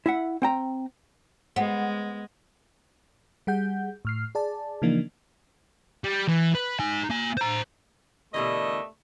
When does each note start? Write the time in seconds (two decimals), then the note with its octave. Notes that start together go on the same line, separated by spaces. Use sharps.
0.06 E4 E5 F#5
0.42 C4 G5 A#5
1.56 G#3 B3 C5 F#5
3.47 G3 G#4 F#5 G6
4.05 A2 F6 C7
4.35 G#4 D5 A5
4.82 C#3 E3 F3 A#3 D4 D#4
6.04 G3
6.28 E3
6.55 B4
6.80 D#4 G#5
7.10 A#3 G#5
7.37 C5 A#5
8.34 B2 D3 E3 A3 G4 A#4 D5 D#5